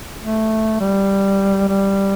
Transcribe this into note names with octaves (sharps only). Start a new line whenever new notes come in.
A3
G3
G3